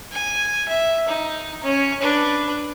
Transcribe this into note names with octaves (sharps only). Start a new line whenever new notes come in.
G#5
E5
D#4
C#4
D4 B4